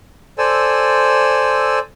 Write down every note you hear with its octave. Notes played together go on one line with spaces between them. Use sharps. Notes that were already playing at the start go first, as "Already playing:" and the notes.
A4 C5 D5 G#5 E6